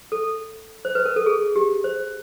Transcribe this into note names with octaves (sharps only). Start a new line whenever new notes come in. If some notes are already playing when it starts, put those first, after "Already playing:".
A4
C5
B4
A#4
A4
G#4
G4
C5